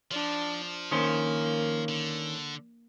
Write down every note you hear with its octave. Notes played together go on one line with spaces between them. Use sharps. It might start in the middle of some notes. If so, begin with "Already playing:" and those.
F3 D4
D#3 A#3 C#4 C5
D3